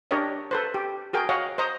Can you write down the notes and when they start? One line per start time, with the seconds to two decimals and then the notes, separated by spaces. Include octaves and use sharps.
0.11 D4 G4 A#4 C#5 D#5
0.51 A4 B4 C5
0.74 G4
1.13 F#4 G#4 A#4 G5
1.29 F#4 C#5 D#5 F5 F#5
1.58 C5 D#5 A#5 D#6